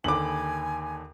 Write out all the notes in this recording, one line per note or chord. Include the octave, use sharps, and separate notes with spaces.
D#2 D3 G#5 B5 D6 F#7